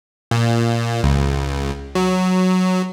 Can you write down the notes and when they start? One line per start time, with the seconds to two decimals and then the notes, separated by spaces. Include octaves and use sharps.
0.31 A#2
1.03 C#2
1.95 F#3